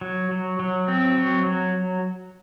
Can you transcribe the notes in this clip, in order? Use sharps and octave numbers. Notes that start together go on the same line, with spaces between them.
F#3
F#3
F#3
C4
F#3
F#3